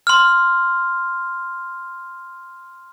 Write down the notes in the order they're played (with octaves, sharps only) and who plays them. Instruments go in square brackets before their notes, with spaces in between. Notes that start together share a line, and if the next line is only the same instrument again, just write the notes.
[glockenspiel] C6 F6